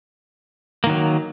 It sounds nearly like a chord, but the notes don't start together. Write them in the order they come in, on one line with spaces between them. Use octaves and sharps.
A#3 D#3 F#3